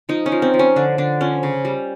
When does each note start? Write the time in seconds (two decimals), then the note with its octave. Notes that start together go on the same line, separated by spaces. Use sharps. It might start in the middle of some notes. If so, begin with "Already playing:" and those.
0.09 F3 D#4
0.26 C#4
0.32 F3
0.42 C4
0.54 F3
0.59 C#4
0.76 D3 D4
0.98 D3 D4
1.21 F3 C#4
1.43 C#3
1.65 G3